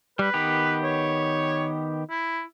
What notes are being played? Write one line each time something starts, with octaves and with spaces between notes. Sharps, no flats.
G3 B4
D#3 B3 G4
C#5
E4